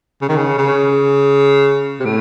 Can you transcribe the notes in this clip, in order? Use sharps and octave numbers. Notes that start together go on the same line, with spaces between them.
C#3
D#3
C#3
C#3
C3
A2